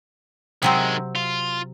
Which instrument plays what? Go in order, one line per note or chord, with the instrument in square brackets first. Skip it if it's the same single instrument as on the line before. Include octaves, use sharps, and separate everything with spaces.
[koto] C3 F#3 C4 [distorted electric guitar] D#3 G#3
[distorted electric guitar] F4